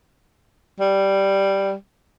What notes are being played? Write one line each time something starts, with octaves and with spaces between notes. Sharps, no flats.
G3